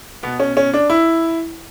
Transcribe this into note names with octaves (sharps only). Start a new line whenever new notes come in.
B2 B3
C#4
C#4
D4
E4